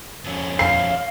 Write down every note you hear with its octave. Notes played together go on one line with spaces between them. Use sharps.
F2 C#4
F5 C7